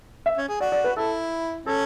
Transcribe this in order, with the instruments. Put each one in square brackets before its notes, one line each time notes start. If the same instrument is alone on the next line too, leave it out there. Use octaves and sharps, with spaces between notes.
[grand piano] E5
[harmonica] C#4
G#4
[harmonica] F#4 [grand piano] D5
[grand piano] D5
B4
[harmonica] E4 [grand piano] A4
[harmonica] C#4 [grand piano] A4